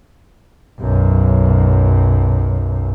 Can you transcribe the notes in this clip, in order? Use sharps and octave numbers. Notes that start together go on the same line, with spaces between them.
B1 F#2